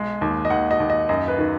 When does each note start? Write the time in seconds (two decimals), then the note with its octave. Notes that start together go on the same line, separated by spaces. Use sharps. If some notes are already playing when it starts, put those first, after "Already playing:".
Already playing: B1 G#3
0.21 D#2
0.45 D#5
0.50 D#2 F#5
0.71 D#5
0.80 D#2
0.90 D#5
1.09 F#2 D#5
1.28 B4
1.38 D#3